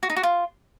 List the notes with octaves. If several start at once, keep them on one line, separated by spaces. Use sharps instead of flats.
F#4
D#4
F#4
F4